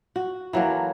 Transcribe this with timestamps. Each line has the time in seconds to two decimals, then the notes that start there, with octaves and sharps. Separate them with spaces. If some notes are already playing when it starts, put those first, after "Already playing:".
0.16 F#4
0.53 E3 F#3 A3 A#3